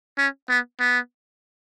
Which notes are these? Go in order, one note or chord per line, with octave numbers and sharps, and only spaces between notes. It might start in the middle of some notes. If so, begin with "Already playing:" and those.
C#4
B3
B3